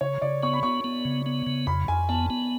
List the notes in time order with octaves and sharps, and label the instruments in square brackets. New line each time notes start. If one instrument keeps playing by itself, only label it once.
[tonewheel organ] C#3 [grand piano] C#5
[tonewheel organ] C#3 [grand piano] D5
[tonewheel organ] B3 [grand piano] C#6
[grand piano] B5
[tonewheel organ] B3 [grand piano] C#6
[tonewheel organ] B3
C#3
B3
C#3
[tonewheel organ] F2 [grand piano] B5
[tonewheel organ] F2 [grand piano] G#5
[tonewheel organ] B3 [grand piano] A5
[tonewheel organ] B3